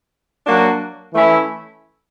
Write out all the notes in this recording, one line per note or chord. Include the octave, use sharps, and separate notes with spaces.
F#3 A#3 D4 F#4
E3 A3 C#4 E4